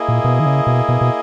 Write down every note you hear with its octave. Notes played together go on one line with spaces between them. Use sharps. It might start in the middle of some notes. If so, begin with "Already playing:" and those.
Already playing: A#3 E4 G#4 D#5
A#2
B2
D#3
C#3
B2
B2
B2